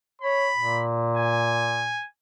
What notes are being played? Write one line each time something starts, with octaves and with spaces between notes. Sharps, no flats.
C#5 B5
A#2
G#5